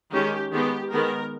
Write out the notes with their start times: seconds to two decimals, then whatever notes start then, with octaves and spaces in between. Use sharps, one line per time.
0.12 D#3 G#3 C#4 G4
0.52 D#3 G#3 B3 G4
0.91 D#3 G#3 B3 A#4